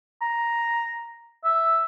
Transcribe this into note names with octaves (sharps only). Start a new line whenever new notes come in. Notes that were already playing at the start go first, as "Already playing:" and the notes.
A#5
E5